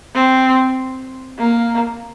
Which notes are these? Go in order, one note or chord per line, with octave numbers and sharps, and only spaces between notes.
C4
A#3